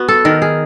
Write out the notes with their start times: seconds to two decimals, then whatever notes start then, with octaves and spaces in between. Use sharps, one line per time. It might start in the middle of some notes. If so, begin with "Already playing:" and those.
Already playing: B3 F#4
0.08 A4
0.25 D#3 A#4
0.42 G#4